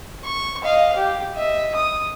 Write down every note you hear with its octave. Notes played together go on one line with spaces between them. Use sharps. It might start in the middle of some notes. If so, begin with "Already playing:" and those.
C#6
D#5 F5
G4
D#5 E5
D#6